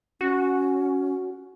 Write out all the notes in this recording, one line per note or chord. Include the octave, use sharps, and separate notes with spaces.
C#4 F#4